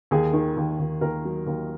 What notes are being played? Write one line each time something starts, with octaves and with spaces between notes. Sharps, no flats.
D#2 G#4
D#3
D#2
D#2
D#2 A#4
F#3
D#2